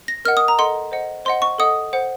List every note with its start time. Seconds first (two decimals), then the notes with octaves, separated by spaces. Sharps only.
0.08 A#6
0.25 A#4 D#5 F#5 F6
0.37 D#6
0.48 A#5
0.59 A4 D#5 F#5 C6
0.92 C5 D#5 F#5
1.25 C5 D#5 F#5 C6
1.42 C#6
1.58 A4 D#5 F#5 D#6
1.93 C5 F#5